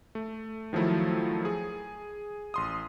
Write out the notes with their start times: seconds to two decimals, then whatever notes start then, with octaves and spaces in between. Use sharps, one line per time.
0.15 A3
0.73 D#3 F3 F#3 A3 E4
1.45 G#4
2.54 A1 C6 D#6